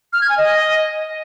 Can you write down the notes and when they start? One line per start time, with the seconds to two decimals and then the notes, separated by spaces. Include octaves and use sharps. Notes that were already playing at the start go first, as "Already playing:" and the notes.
0.13 F6
0.21 G#6
0.29 G#5
0.38 D#5